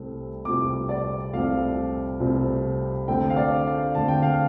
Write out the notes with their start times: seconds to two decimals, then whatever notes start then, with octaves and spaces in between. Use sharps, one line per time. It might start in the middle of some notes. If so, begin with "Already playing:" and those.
Already playing: C2 C3 A3 C4
0.45 C2 C3 A3 C4 D6
0.89 D5
1.33 C2 C3 A3 C4 F5
2.20 C2 C3 A3 C4
3.08 D2 D3 A3 C4 G5
3.30 F5
3.36 D5
3.67 F5
3.95 D2 D3 A3 C4 A5
4.08 G5
4.22 F5